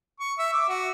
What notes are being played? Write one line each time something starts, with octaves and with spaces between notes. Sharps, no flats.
C#6
E5
D6
F#4